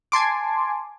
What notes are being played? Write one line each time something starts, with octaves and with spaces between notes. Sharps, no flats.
G#5 A5 C6 D6